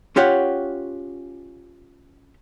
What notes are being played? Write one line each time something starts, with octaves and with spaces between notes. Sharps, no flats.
C#4 F4 G4 C#5 F#5